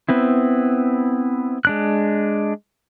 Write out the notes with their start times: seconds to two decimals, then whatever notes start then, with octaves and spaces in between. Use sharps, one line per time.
0.09 B3 C4 E4
1.65 G#3 D4 F#6